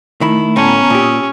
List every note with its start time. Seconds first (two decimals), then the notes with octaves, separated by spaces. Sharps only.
0.21 D#3 A3 E4
0.56 D2 A2 B3 C#4 A5 A#5
0.90 A#2 G4 D#6 E6